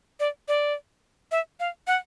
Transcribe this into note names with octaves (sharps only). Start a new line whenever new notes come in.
D5
D5
E5
F5
F#5